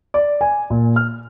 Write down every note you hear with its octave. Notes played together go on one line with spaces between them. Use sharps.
D5
G#5
A#2
F6